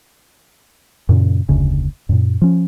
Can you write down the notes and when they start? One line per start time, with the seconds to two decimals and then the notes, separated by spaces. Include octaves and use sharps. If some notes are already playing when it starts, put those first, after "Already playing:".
1.09 F#2 A#2 C#3
1.49 F1 D2 C#3
2.09 F#2 A#2
2.42 F3 C#4